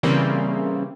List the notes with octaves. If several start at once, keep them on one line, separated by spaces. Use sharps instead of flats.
C#3 E3 G3 A#3 C4